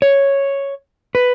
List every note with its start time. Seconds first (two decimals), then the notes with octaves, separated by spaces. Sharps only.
0.02 C#5
1.15 B4